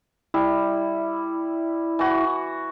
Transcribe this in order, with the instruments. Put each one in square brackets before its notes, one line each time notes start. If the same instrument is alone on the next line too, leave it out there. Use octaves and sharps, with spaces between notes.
[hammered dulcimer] G3 [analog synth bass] E4
[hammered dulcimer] E3 F#4